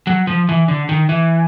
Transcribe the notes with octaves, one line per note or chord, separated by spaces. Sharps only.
F#3
F3
E3
D3
D#3
E3